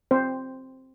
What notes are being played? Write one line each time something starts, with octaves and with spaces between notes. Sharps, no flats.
C4 C5